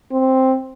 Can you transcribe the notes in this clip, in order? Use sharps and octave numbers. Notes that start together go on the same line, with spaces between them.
C4